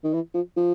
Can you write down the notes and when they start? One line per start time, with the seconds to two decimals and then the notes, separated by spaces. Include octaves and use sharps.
0.04 D#3
0.14 E3
0.34 F3
0.57 F3